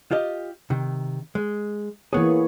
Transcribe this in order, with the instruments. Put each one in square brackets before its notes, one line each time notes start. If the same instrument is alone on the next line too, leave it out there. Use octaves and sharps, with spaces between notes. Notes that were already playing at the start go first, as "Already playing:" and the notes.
[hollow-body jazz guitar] F4 G4 D#5
C3 D#3
G#3
[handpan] E3 A#3 C#5 [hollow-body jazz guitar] B3 G#4